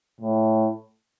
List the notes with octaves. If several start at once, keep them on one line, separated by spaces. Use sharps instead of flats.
A2